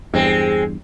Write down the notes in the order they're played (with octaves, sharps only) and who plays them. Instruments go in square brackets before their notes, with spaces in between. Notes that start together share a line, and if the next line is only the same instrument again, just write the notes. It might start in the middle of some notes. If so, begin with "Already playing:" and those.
[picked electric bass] E2 G2 [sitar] G#3 C4